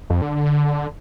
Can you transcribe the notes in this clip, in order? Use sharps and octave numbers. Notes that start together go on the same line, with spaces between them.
F2
D3
D3
D3